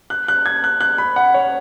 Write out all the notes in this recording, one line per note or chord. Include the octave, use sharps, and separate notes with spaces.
F#6
F#6
G#6
F#6
F#6
B5
F#5
C#5